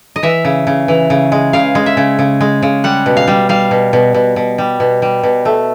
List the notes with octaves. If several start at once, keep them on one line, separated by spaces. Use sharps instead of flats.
D#5
E3 E5
C#3
C#3
E3
C#3
G#3
C#3 F5
G#3
E5
C#3
C#3
G#3
C#3
G3 F#5
B2
F5
G3
G3 F5
B2
B2
B2
B2
G3
B2
G3
B2
A3